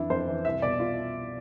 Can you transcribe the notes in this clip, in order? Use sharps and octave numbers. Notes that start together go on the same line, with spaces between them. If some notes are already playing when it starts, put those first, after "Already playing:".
Already playing: F2 E3 D4 E4
F2 C5
E3
C2 E5
B2 D5
F4